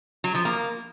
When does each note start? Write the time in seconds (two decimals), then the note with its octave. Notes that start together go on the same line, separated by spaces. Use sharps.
0.24 F#3
0.35 F3
0.45 A#3